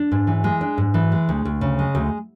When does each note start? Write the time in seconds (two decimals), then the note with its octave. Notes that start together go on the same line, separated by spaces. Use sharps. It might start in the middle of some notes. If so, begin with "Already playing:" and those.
Already playing: D4
0.12 G#2
0.27 E3
0.44 G#3
0.61 D4
0.78 G#2
0.94 E3
1.12 G#3
1.29 D2
1.45 D2
1.61 C#3
1.79 G#3
1.95 D2